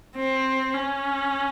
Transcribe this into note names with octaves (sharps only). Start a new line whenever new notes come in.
C4
C#4